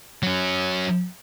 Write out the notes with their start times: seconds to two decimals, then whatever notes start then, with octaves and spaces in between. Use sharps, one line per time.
0.23 F#3 C#4